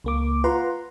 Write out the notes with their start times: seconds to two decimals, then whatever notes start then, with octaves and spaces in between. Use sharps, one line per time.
0.04 C#2 A#3 D6
0.44 F4 B4 F#5 A#5 C6